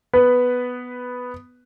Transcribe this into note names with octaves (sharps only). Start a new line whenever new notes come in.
B3 B4